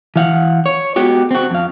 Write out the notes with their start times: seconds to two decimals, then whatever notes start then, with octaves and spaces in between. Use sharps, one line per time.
0.16 E3 F5 F#5
0.66 C#5
0.96 G#3 B3 F#4 G4
1.31 C4 F#4
1.51 F2 F5